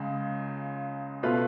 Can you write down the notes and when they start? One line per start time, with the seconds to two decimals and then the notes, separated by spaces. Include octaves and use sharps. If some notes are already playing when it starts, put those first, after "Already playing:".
Already playing: C#2 C#3 G#3
1.23 B2 A3 F4 B4